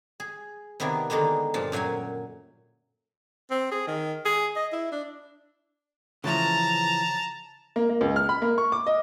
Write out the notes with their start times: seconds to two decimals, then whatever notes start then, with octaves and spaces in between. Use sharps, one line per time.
0.20 G#4
0.80 C3 D#3 B3 D4 E4
1.10 D3 D#3 G#3 A#3 B3
1.54 G2 A#2 F3 A5
1.72 F#2 A#2 F#3 G5 G#5
3.51 C4
3.72 G#4
3.87 D#3
4.25 G#4
4.56 D#5
4.73 E4
4.92 D4
6.24 C#3 E3 F3 A5 A#5
7.76 A#3
7.90 A#3
8.01 C#2
8.16 F6
8.29 B5
8.42 A#3
8.58 C#6
8.72 D6
8.87 D#5